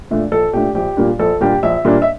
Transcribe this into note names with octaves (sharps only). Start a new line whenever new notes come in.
A#2 A3 D4
A#1 A4
A#2 A3 D4 G4
A#1 G4
A#2 G3 A#3 D4
A#1 A4
A#2 G3 A#3 D4 G4
A#1 E5
A#2 G3 A#3 D4
E5